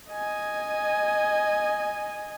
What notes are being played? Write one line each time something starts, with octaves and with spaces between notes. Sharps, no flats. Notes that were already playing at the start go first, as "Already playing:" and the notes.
D#5 G#5